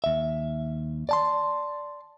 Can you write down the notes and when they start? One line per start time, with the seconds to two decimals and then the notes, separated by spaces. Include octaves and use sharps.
0.04 D#2 E5
1.09 D5 A5 C6